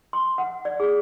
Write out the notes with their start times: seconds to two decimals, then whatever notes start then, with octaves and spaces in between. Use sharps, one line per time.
0.13 C6
0.38 F#5
0.65 D5
0.80 G#4